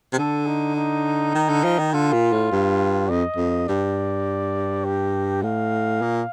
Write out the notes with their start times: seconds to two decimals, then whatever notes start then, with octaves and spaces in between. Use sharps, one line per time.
0.13 C3
0.17 D3 A4
0.47 D#4
0.76 D#4
1.35 D#3
1.49 D3
1.64 F3
1.79 D#3
1.93 D3 F4
2.13 A#2
2.32 A2
2.52 G2
3.09 F2 D#5
3.36 F2
3.68 G2 D5
4.85 G4
5.43 A2 F5
6.02 A#2